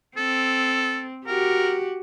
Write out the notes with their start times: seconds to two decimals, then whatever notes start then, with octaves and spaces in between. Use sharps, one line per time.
0.17 C4 A4
1.27 F#4 G4 A#4